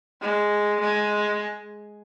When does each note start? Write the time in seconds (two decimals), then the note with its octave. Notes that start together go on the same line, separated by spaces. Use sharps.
0.21 G#3
0.80 G#3